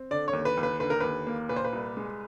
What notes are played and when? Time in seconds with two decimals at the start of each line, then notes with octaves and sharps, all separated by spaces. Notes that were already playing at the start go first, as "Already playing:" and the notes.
Already playing: C4
0.11 D3 D5
0.28 C#5
0.33 D#2
0.45 B4
0.57 D#2
0.63 B4
0.80 D3 B4
0.90 A#4
1.00 D#2 B4
1.27 A#3
1.49 A#2 B4
1.56 C5
1.64 B4
1.73 C2
1.97 G#3